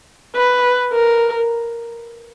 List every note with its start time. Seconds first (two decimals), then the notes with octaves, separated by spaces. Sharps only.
0.36 B4
0.93 A#4